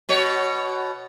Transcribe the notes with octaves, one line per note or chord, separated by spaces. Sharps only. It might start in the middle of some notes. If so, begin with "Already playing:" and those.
B2 F#4 C#5